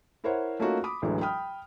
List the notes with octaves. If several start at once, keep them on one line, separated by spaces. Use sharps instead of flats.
E4 A#4 C5 C#5 E5 F#5
A3 A#3 C#4 D#4 F4 F#4
B5 D6 D#6
A1 D2 D3 E3 F#3 G#3
G5 B5 D#6 F6